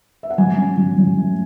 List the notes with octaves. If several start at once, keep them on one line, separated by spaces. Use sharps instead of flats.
E5
F#5
F#3 G#5
C#4
F#3
F#3
A3